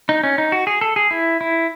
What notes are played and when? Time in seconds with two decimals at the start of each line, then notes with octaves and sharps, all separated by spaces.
0.09 D#4
0.23 C#4
0.38 D#4
0.52 F#4
0.67 G#4
0.81 A4
0.96 G#4
1.11 E4
1.41 E4